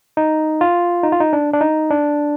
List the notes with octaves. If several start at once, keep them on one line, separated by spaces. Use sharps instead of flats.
D#4
F4
D#4
F4
D#4
D4
D4
D#4
D4